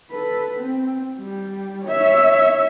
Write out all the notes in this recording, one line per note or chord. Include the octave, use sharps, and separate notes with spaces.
A4 B4
C4
G3
C#5 E5